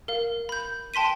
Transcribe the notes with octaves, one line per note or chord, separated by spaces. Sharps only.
A#4 F5
B5 G6
G5 A5 C6 B6 D#7